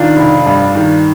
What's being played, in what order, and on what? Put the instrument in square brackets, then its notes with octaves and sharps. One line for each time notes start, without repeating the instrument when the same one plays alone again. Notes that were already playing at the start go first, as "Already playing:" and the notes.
Already playing: [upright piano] D#3 D4 F4
F1
G2
D#3